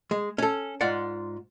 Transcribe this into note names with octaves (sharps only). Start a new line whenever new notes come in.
G#3
C#4 A4
G#2 F4 D5 F#5